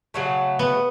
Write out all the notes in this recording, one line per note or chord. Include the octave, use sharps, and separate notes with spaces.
C#3 F#3 A3
B3